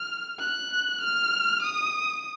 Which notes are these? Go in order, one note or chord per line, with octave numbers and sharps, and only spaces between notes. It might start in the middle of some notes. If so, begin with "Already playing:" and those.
Already playing: F6
F#6
F6
D#6